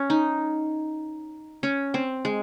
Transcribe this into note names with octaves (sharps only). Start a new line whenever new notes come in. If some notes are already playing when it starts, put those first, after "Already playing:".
Already playing: C#4
D#4
C#4
C4
G#3